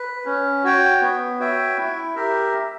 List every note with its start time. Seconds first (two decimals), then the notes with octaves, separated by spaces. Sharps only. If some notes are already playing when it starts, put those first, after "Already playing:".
Already playing: B4
0.25 C#4
0.64 F#4 C#5 G5
1.01 B3
1.39 F#4 C#5 E5 G5
1.77 E4
2.16 G4 A#4 E5